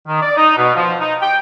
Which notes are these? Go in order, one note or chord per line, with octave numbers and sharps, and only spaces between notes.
D#3
D5
D#4
B2
F3
D#4
G5